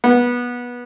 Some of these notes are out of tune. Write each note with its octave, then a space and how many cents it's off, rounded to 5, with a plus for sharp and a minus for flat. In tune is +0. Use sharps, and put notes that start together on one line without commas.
B3 -20